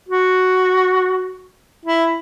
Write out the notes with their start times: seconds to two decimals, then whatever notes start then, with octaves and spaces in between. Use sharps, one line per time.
0.09 F#4
1.85 E4